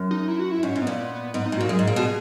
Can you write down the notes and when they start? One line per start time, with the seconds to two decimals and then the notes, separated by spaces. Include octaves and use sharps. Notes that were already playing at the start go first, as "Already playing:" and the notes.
Already playing: F#2
0.11 D#4
0.28 E4
0.39 F#4
0.52 E4
0.63 G#2 C#4
0.76 G#2
0.82 B3
0.87 A#2
1.34 G#2 B3
1.46 D#4
1.52 G#2
1.57 A#2 F#4
1.69 F#2 G#4
1.79 G#2
1.87 A#2
1.96 B2